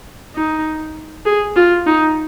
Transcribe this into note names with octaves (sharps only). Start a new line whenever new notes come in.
D#4
G#4
F4
D#4